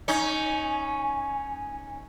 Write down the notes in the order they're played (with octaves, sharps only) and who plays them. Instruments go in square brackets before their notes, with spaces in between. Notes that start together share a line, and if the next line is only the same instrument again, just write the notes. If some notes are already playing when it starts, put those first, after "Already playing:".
[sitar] C#4 D#4 [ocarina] G#5